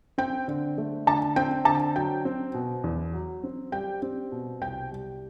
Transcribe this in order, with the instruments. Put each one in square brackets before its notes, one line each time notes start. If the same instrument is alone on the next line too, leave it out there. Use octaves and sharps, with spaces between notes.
[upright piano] C4 [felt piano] G5
[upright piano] D3
A3
[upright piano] D3 [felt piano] A5
[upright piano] C4 [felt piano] G5
[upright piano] D3 [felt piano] A5
[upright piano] F#3 [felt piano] G5
[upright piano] C4
B2
E2
F#3
C4
[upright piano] G3 [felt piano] G5
[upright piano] C4
B2
[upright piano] C2 [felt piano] G5
[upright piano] G3